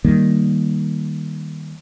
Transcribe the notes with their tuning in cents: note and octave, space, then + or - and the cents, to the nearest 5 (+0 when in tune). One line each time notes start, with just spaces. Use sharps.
D#3 +0 G3 +0 A#3 +0